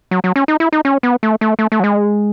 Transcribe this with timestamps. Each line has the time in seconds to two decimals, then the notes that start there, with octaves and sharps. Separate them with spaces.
0.11 F#3
0.24 F#3
0.36 C#4
0.48 D#4
0.60 E4
0.72 D#4
0.85 C#4
1.03 B3
1.23 A3
1.41 A3
1.59 A3
1.72 A3
1.80 F#3
1.84 G#3